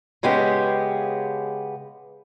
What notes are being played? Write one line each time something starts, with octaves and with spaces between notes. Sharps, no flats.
C#3 G#3 B3 G4